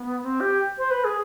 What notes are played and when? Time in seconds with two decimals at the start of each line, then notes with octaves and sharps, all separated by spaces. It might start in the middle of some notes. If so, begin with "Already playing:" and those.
Already playing: B3
0.23 C4
0.41 G4
0.78 C5
0.91 B4
1.04 G#4